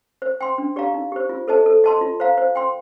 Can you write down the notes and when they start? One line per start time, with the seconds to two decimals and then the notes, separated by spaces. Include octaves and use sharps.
0.22 C5
0.41 G5 C6
0.58 D4
0.76 G4 D5 F5 A#5
0.94 D#4
1.12 G4 C5
1.29 F4
1.48 A4 C5 D#5 A5
1.66 A4
1.84 D#5 A5 C6
2.01 F4
2.20 C5 F5 A#5
2.37 C5
2.55 G5 C6